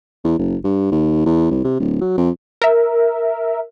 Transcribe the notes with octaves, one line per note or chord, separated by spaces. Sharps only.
E2
F#1
G2
D#2
E2
C2
C3
D1
F#3
F2
A#4 E5